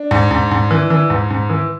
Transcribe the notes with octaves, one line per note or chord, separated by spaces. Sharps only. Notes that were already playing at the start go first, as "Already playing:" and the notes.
Already playing: D4
G#2
G#2
G#2
E3
E3
G#2
G#2
E3